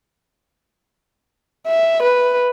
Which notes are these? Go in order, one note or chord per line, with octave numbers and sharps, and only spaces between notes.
E5
B4